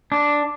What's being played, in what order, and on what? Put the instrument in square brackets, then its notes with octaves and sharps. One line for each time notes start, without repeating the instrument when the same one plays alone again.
[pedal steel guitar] D4